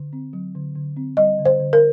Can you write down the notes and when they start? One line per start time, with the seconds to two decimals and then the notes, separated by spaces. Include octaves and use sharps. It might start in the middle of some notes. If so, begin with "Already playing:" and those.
Already playing: D3
0.13 C4
0.33 F#3
0.55 D3
0.75 D3
0.97 C4
1.17 G3 D#5
1.39 D3
1.45 C5
1.60 D3
1.73 A#4